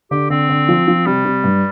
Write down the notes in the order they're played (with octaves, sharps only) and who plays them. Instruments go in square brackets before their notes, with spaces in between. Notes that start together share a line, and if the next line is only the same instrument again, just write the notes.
[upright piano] D3 [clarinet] G4
[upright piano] D3 [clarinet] C4
[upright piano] D3
F3
F3
[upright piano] C3 [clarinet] G3
[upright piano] C3
G2